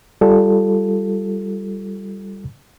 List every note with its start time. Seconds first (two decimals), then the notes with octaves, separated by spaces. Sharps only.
0.21 G3 F4 A4